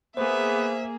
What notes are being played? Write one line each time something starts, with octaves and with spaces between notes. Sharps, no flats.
A#3 B3 G#4 C5 E5